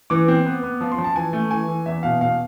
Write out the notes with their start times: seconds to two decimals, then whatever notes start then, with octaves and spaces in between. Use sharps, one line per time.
0.10 E3 D6
0.28 C4
0.46 B3
0.63 B3
0.81 F3
0.92 C6
0.98 F3
1.04 A5
1.16 E3 G#5
1.33 A3
1.51 E3 G#5
1.68 E3
1.86 E2 E5
2.03 B2 F5
2.21 B2 F5